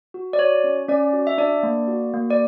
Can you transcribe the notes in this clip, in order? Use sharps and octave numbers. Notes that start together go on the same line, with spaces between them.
F#4
D5
F#4 C#5
C#4
C#4 D5
F#4
E5
D4 D5
A#3
F#4
A#3
D5